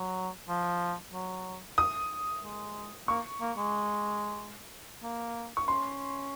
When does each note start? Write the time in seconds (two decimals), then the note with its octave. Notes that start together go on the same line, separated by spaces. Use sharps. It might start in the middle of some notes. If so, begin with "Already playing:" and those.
Already playing: F#3
0.48 F3
1.13 F#3
1.78 D#6
2.44 G#3
3.08 A#3 C#6
3.41 A#3
3.57 G#3
5.03 A#3
5.57 C#6
5.68 C#4 C6